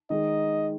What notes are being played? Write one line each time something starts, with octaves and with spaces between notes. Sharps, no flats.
D#3 G#3 D#4 D#5